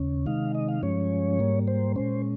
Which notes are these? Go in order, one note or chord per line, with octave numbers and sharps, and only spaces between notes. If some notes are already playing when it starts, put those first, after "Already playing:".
Already playing: D#2 C#3 C#4
C3 D#3 G#3 D#4 F5
D#5
F5
G2 F3 G#3 C#4 C#5
G#2 G3 A#3
C5
A#2 G#3 C#4 C5